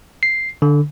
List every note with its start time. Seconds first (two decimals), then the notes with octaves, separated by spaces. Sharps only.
0.23 C7
0.62 D3